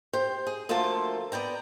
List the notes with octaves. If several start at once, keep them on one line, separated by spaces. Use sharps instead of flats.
G4 C5
G#4
D2 F3 A3 A#3 F4 A5
B3 D5 G5 A#5